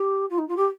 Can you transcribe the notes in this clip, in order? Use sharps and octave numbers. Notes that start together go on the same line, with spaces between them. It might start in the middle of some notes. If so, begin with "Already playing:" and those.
Already playing: G4
F4
D#4
F4
G4